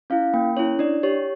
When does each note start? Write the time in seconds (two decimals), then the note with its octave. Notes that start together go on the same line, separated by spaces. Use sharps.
0.10 C#4 E4 F5
0.33 A#3 G5
0.56 C#4 E4 C#5
0.79 D4 D5
1.03 G4 C#5